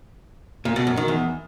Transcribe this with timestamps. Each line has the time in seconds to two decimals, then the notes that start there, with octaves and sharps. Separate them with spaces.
0.65 A#2
0.76 B2
0.87 F#2
0.97 D#3
1.08 E2